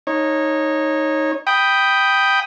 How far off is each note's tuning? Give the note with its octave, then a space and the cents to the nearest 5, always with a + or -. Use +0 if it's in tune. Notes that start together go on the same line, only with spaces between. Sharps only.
D#4 +0 C#5 -20
G5 +0 B5 +0 D#6 +0